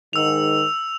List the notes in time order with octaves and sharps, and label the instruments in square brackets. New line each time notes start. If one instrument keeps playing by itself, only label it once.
[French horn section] G#2 D#3 [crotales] E6 F7